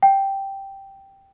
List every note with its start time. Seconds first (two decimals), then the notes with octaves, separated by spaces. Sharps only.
0.03 G5